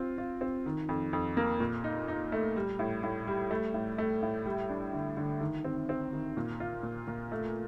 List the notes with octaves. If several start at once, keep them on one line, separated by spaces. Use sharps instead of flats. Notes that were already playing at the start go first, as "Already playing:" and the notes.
Already playing: C4 F4
F4
C4
D#3
F2
F2
A#3
A#2
D#4
D#4
A3
G3
A2
A2
G3
A3
A2
A3
A2
G3
D4
D3
D3
D#3
C4
C4
D#3
A#2
F4
A#2
A#2
A3